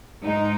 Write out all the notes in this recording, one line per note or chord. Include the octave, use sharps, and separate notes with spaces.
G#2 G#3 D#4